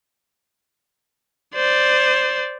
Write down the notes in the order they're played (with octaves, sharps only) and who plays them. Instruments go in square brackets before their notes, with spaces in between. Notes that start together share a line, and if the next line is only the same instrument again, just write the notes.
[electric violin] C5 D5